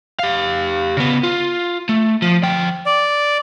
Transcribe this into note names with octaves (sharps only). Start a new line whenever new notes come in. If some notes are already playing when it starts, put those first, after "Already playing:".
G4 F5
C#3 B3
F4
A3
F3
F3 G5
D5